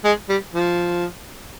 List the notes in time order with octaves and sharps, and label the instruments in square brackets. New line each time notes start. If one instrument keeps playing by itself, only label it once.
[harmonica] G#3
G3
F3